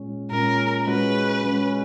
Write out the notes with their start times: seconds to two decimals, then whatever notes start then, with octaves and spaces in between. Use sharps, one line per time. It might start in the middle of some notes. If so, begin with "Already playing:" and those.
Already playing: A#2 G#3 C#4
0.31 A#2 G#3 C#4 A#4
0.87 G#3 C#4 F#4 B4
1.42 G#3 C#4 F#4